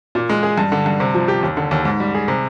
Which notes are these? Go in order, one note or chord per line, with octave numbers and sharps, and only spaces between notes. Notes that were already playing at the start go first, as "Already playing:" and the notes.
A#2
G#3
G#4
G2
D3
G2
C3
F3
G4
D#2
D3
D#2
G#2
G3
G#4
C3